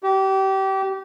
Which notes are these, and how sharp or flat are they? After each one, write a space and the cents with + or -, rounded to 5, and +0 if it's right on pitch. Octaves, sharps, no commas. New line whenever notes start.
G4 -30